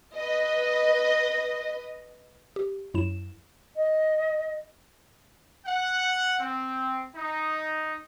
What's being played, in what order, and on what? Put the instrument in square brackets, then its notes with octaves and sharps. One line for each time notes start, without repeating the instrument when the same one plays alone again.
[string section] B4 D#5
[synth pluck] G4
F#2 F#3 E4 E7
[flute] D#5
[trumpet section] F#5
C4
D#4